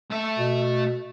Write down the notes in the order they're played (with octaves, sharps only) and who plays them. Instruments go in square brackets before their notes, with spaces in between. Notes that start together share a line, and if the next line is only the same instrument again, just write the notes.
[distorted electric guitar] A3 E5
[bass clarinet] B2